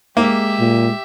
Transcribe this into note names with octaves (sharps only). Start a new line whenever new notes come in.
G#3 A#3 G4 E5
A#2